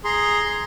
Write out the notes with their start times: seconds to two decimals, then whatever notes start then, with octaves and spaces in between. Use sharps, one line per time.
0.04 G#4 A#5 C6
0.44 G#4